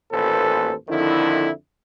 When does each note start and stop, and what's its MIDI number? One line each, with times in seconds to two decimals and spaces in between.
0.12 0.73 33
0.12 0.73 39
0.12 0.73 46
0.12 0.73 69
0.12 0.73 71
0.12 0.73 72
0.89 1.49 41
0.89 1.49 50
0.89 1.49 51
0.89 1.49 53
0.89 1.49 64